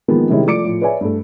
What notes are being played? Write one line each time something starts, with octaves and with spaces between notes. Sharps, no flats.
D#3 F3 G#3 A#3 B3
C3 D#3 G3 G#3 C#4 E4
F3 A3 D5 D6 C#7 D7
A2 F3
B4 C#5 D5 E5 G#5
G2 A3